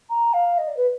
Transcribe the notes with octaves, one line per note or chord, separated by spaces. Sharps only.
A#5
F5
D#5
D5
B4